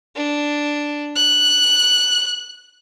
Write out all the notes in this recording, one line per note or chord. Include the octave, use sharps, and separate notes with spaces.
D4
F#6